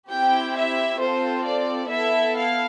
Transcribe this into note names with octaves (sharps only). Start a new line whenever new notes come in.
C4 E4 G4 G5
E5
C4 F4 A4 C5
D5
B3 E4 A4 E5
F5